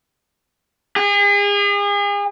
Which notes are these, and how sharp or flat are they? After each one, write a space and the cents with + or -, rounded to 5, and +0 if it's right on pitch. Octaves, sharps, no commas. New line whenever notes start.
G#4 -40